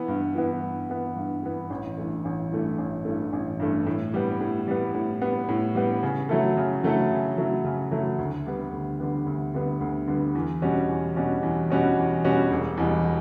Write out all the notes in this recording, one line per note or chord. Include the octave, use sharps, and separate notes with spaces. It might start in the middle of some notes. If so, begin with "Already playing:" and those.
Already playing: E3 B3
G2
E3 B3
G2
E3 B3
G2
E3 B3
A1
G2 E3 A3
A1
G2 E3 A3
A1
G2 E3 A3
A1
G2 E3 A3
A2
G3 B3
A2
G3 B3
A2
G3 B3
A2
G3 B3
C#3
F#3 A3 E4 A4
C#3
F#3 A3 E4 A4
C#3
F#3 A3 E4 A4
C#3
F#3 A3 E4 A4
D2
D3 G3 B3
D2
D3 G3 B3
D2
D3 G3 B3
D2
D3 G3 B3
E2
B2 G3 C#4 F#4
E2
B2 G3 C#4 F#4
E2
B2 G3 C#4 F#4
E2
B2 G3 C#4 F#4
E1
E2 B2 G3